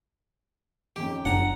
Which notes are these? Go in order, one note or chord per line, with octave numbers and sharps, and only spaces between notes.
F2 D#3 C#4 G4
F#1 D4 F#5 A#5